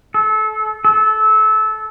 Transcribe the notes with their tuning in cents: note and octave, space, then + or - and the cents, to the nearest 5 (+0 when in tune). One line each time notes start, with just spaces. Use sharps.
A4 -30
A4 -20